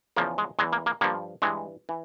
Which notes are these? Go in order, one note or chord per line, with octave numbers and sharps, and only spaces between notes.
E2 C#3 F3 A#3
G#3
E2 E3 G#3
A#3
A#3
G2 F3 A#3
G2 E3 G#3
E3